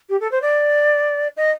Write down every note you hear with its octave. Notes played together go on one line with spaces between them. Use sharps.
G4
A4
C5
D5
D#5